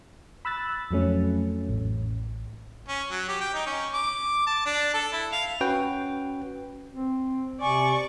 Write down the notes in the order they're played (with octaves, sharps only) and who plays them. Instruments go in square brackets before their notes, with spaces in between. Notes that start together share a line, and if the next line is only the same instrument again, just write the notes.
[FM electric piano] B5 E6 F#6 A6
F2 F#3 A3 C#4
A1
[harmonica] C#4
F#3
G4
G5
D#4
C#4
D6
A5
D4
A4
E4
F5
[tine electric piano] C#4 F#4 B4 G5
[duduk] C4
[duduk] C3 [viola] D5 C#6 [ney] G#5